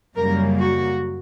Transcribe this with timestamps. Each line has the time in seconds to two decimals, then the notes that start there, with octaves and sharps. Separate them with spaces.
0.16 F#2 C#3 G3 A#3 A#4
0.59 F#4